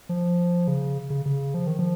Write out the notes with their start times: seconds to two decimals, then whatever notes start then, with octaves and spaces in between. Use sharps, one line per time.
0.09 F3
0.68 C#3
1.10 C#3
1.26 C#3
1.54 F3
1.67 D#3
1.79 F3